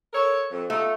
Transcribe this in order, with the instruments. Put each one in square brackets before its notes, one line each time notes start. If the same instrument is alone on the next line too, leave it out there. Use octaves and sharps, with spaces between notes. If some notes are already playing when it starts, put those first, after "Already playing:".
[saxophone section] A4 A#4 C#5
F2
[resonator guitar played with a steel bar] A3 [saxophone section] D#4 F4